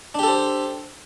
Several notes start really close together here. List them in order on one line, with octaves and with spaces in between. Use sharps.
D4 G4 A4 C5